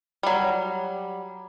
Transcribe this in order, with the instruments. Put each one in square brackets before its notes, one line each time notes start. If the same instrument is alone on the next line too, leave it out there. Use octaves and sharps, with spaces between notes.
[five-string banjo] F#3 G3